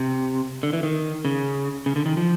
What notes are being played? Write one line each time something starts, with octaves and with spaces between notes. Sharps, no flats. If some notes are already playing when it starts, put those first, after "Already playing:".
Already playing: C3
D3
E3
D#3
C#3
C#3
D3
D#3
F3